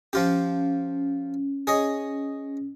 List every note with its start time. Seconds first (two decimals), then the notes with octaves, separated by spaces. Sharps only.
0.13 F3 C#4 F4 G4
1.67 G#4 C#5 D#5